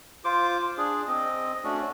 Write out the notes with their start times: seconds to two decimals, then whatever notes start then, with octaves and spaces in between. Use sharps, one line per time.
0.24 F4 C5 D6
0.77 D4 G#4
1.07 C4 D#5
1.64 A3 C#4 D4 F#4